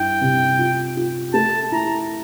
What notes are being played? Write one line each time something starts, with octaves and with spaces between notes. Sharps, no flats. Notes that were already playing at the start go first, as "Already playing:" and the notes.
Already playing: G2 E4 G5
C3
F4
F4
A3 A5
E4 A#5